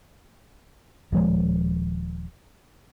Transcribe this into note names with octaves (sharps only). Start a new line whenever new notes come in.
D#1 F3 G#3